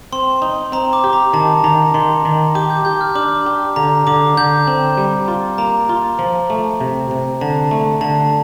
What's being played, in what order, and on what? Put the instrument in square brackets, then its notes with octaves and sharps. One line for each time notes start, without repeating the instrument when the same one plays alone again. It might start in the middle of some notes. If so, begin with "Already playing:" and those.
[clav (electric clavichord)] C4 [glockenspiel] C6
[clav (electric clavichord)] D#4
[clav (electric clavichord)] C4 [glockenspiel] A#5
[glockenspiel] D6
[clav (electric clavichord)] G4
[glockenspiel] A#5
[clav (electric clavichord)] D#3 [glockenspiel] A5
[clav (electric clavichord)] D#3 [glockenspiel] A#5
[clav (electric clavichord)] D#3 [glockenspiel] C6
[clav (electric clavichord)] D#3
[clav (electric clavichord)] G4 [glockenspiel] D6
[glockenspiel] G6
[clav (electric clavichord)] G4 [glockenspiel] G6
[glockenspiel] F6
[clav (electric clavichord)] D4 [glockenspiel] D6
[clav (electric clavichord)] G4
[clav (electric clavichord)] D3 [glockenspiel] A#5
[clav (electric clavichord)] D3 [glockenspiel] D6
[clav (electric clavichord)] D3 [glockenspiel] G6
[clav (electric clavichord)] C4
G3
F4
[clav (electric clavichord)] A#3 [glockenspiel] A#5
[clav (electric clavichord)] F4
F3
A3
C3
C3
[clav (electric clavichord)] D3 [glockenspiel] A5
[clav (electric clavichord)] A3
[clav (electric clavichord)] D3 [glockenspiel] A5